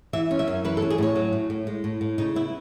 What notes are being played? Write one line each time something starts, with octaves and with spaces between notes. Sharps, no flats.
E3 E5
C#4
E5
F#2
E3 B4
A4
C#4
G#4
A2 C#5
F#3
A2
A2
G#3
A2
A2
C#3 D#4
B3 E4